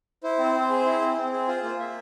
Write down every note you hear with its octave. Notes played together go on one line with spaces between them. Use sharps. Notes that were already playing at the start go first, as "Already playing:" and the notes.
E4 C5
C4
C4
G#4
E4
C4
C4
G#4
F4 C5
A#3 C5
A#3 E5